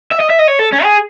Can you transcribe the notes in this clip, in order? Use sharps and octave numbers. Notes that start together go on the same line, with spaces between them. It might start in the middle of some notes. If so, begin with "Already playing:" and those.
E5
D#5
E5
D#5
C#5
A4
C#4
G#4